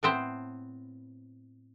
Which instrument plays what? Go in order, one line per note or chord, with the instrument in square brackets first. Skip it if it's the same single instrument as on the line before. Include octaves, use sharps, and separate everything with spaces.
[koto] A2 B3 C4 C5